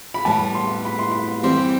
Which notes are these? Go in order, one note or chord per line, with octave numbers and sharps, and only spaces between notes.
B5
A2 G3 B3 A5
C6
B5
C6
B5
E3 G3 C4 G4 C6